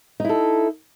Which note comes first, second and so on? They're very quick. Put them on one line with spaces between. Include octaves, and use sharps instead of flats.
D#4 E4 A4